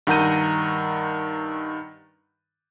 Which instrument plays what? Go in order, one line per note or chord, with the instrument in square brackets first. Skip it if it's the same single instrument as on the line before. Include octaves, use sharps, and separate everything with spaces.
[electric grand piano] G2 D#3 F#5 A#5 G6 D#7